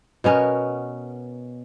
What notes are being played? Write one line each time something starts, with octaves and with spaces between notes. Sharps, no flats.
B2 B3 C#4 A#4